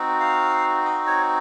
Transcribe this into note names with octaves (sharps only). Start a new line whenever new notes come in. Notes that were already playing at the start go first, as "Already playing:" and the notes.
Already playing: C4 D#4 F#4
F5
D#5
C#5